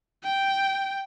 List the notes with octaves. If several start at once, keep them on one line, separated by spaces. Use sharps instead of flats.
G5